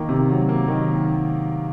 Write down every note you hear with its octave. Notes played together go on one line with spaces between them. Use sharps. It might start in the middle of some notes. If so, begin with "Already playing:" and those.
Already playing: D#3 A#3
C3
F#3
A#3
D#3